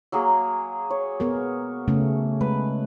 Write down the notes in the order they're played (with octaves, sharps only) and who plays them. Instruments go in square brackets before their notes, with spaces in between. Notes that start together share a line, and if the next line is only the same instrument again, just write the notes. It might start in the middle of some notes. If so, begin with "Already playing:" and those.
[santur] F#3 A#3 G#4
C#5
[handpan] B3 G#4 A#4
C#3 A3 C#4
[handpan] G#3 [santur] B4